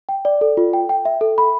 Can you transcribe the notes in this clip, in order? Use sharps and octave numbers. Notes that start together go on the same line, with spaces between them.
G5
D5
A4
F4
G5
G5
E5
A4
B5